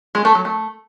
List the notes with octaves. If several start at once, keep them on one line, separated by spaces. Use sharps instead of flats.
G#3
A3
F#3
A3